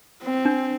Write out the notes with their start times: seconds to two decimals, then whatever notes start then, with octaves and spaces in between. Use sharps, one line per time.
0.23 C4
0.45 D4